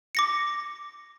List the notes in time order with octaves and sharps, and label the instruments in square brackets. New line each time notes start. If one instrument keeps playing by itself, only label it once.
[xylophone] D6 A#6 C#7